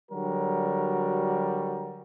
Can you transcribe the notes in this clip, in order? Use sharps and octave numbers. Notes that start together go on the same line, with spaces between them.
D3 F#3 G3 F#4 A#4